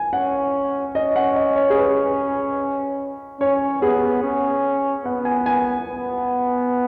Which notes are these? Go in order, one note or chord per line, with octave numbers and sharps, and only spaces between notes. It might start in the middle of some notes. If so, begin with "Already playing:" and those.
Already playing: G#5
C#4 F#5
C#4 D#5
F#5
D#5
C#5
G#4
B4
C#4 C#5
B3 G#4
C#4
B3 F#5
G#5
G#5
B3